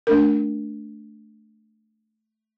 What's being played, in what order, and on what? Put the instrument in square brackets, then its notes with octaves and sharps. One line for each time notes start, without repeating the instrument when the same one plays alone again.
[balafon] A3 D4 A#4